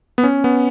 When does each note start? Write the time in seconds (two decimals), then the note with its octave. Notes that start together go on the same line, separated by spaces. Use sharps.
0.18 B3
0.24 C#4
0.44 B3